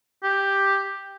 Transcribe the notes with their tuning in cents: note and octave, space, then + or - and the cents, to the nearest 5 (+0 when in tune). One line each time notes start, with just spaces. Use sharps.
G4 +5